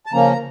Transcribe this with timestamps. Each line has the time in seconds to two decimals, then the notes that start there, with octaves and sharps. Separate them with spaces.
0.06 A5
0.13 C#3 F3 A#3 C#4 A#5